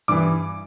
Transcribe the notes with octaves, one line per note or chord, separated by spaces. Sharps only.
G2 E3 D6